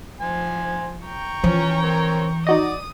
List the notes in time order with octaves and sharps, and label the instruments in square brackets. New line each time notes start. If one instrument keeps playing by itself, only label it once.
[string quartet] F3 [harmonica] C5 G#5
[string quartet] G5 A#5 C#6
[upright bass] E3 [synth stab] F3 [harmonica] C#4
[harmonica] C4 A#4 C#5
[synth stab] D#4 F#4 D#5 [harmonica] D5 [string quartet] D#6